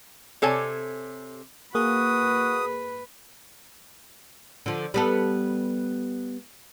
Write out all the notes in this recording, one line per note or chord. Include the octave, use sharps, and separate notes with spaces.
C3 A4 C#5 G#5
A#3 F#4 G#4 B4 D#6
D3 F3
G3 B3 A4